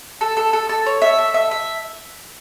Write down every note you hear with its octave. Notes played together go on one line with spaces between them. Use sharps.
A4
A4
A4
A4
C#5
E5
A4
E5
E5